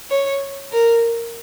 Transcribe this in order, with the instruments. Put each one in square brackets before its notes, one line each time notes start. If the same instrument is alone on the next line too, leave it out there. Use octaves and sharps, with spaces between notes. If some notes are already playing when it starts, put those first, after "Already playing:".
[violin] C#5
A#4